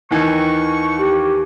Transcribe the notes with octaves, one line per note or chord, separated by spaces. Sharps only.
D#2 D#3 E3 C#6
G4